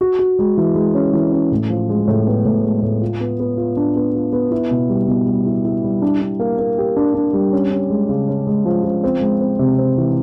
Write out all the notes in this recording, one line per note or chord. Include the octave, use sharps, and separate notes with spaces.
F#4
F#4
G#3
E3
G#3
C#4
E3
C#4
A2
F3
G#3
A2
B3
A2
G#3
A2
F4
B3
B3
F4
D4
B3
F4
B3
E4
B2
G3
B2
G3
E4
E4
G3
D4
D4
A#3
A#3
G4
D4
D4
G3
C#4
C#4
G#3
C#3
C#4
G#3
F3
F3
C4
G#3
C4
C3
C4
E3